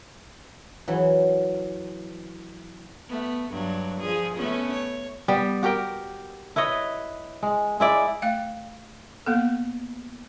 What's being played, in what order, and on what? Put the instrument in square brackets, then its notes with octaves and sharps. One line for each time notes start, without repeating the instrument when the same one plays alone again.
[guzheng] E3 F#3
[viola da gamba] A3 B3
G2 F#3
F3 G#4
A3 B3 C#4
C#5
[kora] G3 B3
F#4 G4 A#4 G5
E4 B4 C#5 D#5
G#3
G#3 E4 D5
[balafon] A3 F5 G5
A#3 B3 A4